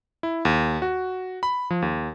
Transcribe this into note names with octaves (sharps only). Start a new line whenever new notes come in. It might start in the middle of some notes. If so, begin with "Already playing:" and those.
E4
D#2
F#4
B5
F3
D#2